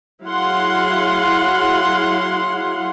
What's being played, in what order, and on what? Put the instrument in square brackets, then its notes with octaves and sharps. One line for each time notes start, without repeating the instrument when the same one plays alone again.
[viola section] F#3 E4 G#4 F5 F#5 C6